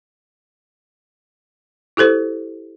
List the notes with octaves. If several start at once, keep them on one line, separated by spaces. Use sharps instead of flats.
E4 G4 A4 C5